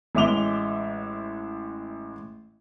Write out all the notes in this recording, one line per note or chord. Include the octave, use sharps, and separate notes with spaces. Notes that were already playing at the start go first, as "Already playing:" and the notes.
A1 G#3 E5 D6 F7 G7